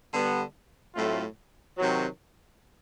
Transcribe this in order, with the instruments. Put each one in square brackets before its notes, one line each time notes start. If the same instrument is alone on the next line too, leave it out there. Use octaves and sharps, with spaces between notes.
[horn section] D3 G3 B3
A2 F#3 A3 C4 F4
C3 D#3 F#3